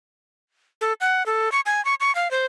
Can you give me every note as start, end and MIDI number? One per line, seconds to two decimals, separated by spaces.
0.81 0.93 69
1.01 1.26 78
1.26 1.52 69
1.52 1.60 85
1.66 1.84 80
1.85 1.94 85
2.00 2.14 85
2.15 2.31 77
2.31 2.46 72